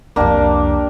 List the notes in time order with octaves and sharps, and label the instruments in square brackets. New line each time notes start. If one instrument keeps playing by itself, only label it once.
[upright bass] C2 F2 [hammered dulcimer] A#3 D4 G4